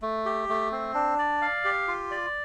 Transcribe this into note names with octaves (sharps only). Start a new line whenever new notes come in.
A3
G4
A3
C4
D4
D5
F5
G4
F4
D5